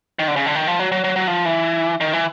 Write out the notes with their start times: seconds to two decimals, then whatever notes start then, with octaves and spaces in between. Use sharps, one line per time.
0.19 D#3
0.28 D3
0.36 C#3
0.46 D3
0.55 D#3
0.67 F3
0.79 F#3
0.92 F#3
1.04 F#3
1.16 F#3
1.28 F3
1.45 E3
2.01 D#3
2.13 E3